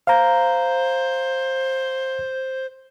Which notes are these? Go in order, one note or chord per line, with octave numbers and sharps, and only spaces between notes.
C5 F5 A#5